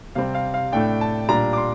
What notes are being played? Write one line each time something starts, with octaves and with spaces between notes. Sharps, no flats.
C3 G3 C4 F5
F5
F5
A2 A3 D4 G5
A5
A#2 G3 D4 A#5
D6
C6